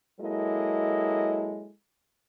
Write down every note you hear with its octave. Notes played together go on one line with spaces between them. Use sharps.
F#3 G#3 A#3 E4 A4 D#5